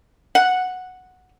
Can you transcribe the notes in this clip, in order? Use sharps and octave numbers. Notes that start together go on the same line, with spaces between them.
F#5